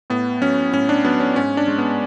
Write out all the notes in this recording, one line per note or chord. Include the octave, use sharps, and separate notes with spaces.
A2 B3
F#3 C#4
A2 C#4
D4
F#3 B3
C#4
G#2 C#4
D4
G#3
B3